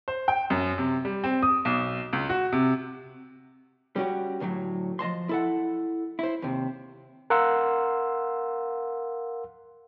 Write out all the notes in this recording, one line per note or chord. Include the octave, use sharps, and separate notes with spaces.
C5
G5
F#2
C3
G3
C4
D#6
B1
C#2
F#4
C3
G3 C#4 F#4 G4
D2 A2 D#3 F#3
F3 D#5 A5 C6
E4 A4 F#5
E4 C5
D#2 C3
A#4 F5 F#5 C6 E6